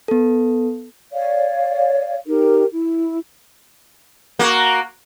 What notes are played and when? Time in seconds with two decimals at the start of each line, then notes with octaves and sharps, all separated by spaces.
0.08 B3 A4
1.12 C#5 D5 F5
2.27 D#4 G4 A#4
2.72 E4
4.39 A#3 F#4